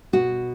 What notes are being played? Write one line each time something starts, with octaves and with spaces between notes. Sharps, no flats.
B2 F#4